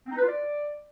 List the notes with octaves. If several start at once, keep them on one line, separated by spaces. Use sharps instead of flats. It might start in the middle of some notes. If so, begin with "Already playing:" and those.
C4
D#4
B4
F4
D5